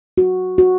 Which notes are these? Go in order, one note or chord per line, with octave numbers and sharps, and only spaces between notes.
F#4
F#4